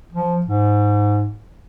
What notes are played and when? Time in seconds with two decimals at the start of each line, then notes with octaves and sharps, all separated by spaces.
0.13 F3
0.46 G#2